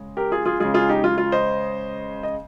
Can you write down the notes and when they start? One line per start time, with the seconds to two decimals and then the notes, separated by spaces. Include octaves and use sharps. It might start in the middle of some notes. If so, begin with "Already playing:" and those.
Already playing: C#3 G#3
0.17 G4 A#4
0.32 F4 G#4
0.46 F4 G#4
0.60 C#3 G#3 F4 G#4
0.74 F4 G#4
0.89 D#4 G4
1.04 F4
1.18 F4
1.32 C5 D#5
2.23 D#5